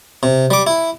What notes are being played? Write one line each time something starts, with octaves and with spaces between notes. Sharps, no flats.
C3
G3 D6
E4